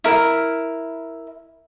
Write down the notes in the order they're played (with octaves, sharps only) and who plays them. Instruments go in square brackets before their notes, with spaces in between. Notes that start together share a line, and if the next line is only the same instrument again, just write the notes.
[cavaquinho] E4 A#4